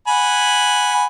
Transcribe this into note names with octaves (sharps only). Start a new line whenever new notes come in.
F#5 G#5 B5